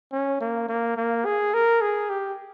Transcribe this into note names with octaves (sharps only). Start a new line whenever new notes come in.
C#4
A#3
A#3
A#3
G#4
A#4
G#4
G4